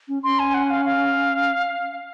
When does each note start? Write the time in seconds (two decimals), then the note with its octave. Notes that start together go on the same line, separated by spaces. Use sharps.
0.08 C#4
0.23 C#4 C6
0.39 G#5
0.54 F#5
0.70 F5
0.85 F5